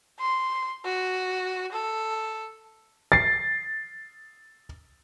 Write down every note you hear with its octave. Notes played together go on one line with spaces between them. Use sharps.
C6
F#4
A4
A6 C7